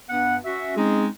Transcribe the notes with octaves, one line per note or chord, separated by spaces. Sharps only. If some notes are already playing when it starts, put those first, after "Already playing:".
G2 B3 F#5
C#4 F#4 E5
G#3 C4 C#4 D#4 G#4 D#5